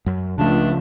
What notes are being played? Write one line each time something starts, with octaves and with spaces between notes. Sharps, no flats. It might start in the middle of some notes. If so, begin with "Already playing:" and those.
F#2
C#2 C#3 F3 A3 D4